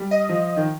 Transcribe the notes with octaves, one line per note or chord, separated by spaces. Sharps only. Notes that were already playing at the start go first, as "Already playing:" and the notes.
Already playing: G3
D#5
F3
D#3